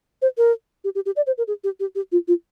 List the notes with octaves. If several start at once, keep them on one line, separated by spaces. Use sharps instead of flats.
C5
A#4
G4
G4
G4
D5
C5
A#4
G#4
G4
G4
G4
F4
F4